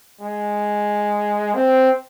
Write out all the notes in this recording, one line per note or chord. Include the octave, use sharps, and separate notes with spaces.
G#3
C4